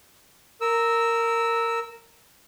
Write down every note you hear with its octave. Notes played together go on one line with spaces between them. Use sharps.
A#4 E6